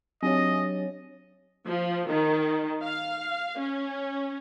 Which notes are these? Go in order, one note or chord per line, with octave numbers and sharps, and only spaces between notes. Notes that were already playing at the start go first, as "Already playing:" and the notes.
F#3 C4 D4 G4 C#5 D#5
F3
D#3
F5
C#4